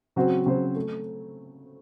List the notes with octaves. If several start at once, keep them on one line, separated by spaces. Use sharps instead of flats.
C#3 F#3 C4 F#4 C5
C#3 F#3 C4 F#4 C5
A3